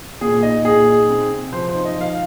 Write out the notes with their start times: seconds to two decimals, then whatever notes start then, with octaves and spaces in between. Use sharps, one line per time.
0.21 A#2 G#4
0.43 D#4 D#5
0.64 A#2 G#4
0.87 D#4
1.09 C4
1.31 C3
1.52 F3 C5
1.69 C5
1.75 D#4
1.85 D#5
1.96 F3 F5